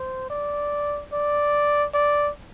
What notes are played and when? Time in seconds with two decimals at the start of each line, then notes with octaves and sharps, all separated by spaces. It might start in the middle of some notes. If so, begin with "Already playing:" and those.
Already playing: C5
0.30 D5
1.13 D5
1.94 D5